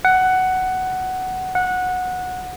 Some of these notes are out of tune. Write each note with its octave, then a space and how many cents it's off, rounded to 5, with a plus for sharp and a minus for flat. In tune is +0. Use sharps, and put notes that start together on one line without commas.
F#5 +10
F#5 -15